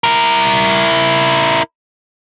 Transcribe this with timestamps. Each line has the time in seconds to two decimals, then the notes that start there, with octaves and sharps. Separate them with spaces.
0.04 E4 A#4